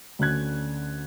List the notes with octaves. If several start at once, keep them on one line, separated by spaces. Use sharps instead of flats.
D2 D3 C#4 F#6 G#6